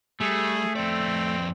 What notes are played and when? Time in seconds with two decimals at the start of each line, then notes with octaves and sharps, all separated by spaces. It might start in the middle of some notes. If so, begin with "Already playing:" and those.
0.21 G3 A3 G#4
0.76 F2 C4 D5